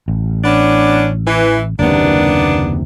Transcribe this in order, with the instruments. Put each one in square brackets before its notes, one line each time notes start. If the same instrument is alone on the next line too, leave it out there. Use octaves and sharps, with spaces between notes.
[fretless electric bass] A1
[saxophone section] B3 C#4 D4
E3
[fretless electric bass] F#1 D#2 C3 [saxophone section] A#3 B3 D4